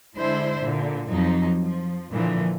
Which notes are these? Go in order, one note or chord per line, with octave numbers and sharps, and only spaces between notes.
D3 G#3 D4 E4 C5
A#2 D3
F2 F3 F#3 D#4
F3
A#2 D3 E3 F3